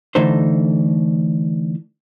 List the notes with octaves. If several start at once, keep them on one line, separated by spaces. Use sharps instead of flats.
D3 E3 A3 D#4 A4 C5